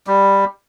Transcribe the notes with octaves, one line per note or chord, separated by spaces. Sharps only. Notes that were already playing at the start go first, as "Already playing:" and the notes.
G3